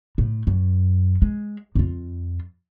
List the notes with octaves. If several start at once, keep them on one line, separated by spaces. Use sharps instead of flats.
A2
F#2
G#3
F2 F4